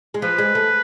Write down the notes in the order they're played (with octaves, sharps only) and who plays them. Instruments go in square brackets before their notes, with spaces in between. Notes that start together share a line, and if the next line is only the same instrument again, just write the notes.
[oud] G#3
[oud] F3 [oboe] B4
[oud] G#3
A3